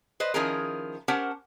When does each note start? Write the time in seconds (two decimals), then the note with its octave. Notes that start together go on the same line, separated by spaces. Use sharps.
0.20 B4 C5 D#5
0.34 D#3 F3 C#4 E4 G#4 A#4
1.08 C#4 G4 A#4 C5 F#5 A5